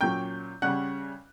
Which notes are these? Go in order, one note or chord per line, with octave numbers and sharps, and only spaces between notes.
A#2 F#3 C#4 G5 G6
C#3 G3 C#4 F#5 F#6